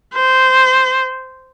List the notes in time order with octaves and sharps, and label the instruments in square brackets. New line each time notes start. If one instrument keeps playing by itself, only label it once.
[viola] C5